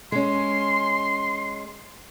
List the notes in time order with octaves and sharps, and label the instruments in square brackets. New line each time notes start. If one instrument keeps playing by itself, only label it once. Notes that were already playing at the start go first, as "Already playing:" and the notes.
[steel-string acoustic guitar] G#3 C#4 [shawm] C6